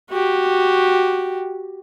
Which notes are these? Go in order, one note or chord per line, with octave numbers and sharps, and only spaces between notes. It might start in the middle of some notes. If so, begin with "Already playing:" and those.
F#4 G4